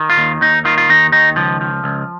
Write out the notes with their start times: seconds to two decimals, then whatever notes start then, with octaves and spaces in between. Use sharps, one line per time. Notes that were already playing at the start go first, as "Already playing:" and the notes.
Already playing: D#3
0.10 F4
0.18 D#2
0.41 D#2 D#4
0.65 D#3 F4
0.78 F4
0.89 D#2 D#4
1.12 D#3 D#4
1.36 C#2 F3
1.61 F3
1.84 C#2